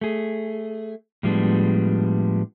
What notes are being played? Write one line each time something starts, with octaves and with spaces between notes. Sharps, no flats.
A3 G#4
A2 F3 G3 G#3 B3 D4